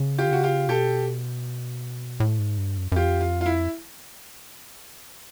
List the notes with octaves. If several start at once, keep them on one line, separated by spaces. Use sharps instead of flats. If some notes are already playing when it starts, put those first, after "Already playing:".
Already playing: C#3
F4 G4
D3
C#3 F#4
F4 G4
B2 G4 A4
A2
G#2
G2
F#2
F#2
F2 F4 G4
F4
F4
E4